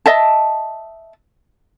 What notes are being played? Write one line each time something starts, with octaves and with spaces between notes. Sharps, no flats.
D#5 E5 A5